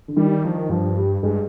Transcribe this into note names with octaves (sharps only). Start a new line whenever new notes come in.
D3
D#3 G3
D#3 F3
G2 F3
G3
G2 G#3